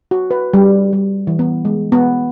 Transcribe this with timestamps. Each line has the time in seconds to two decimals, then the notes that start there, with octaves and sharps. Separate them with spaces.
0.11 F#4
0.31 B4
0.54 G3
0.93 G3
1.27 E3
1.39 B3
1.65 G#3
1.92 B3